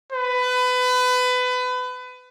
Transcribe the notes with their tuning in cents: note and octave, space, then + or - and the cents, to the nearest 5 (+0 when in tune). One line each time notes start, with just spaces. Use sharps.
B4 +25